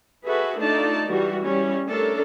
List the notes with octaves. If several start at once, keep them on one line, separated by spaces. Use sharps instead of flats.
F#4 G#4 A4 B4 E5
A3 D4 D#4 F4 D5 A5
E3 G3 F#4
G3 C#4 E4
A3 C#4 D4 A4 A#4